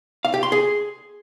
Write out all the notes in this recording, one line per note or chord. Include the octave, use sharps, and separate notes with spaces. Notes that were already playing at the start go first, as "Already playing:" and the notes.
F5
G4
C6
G#4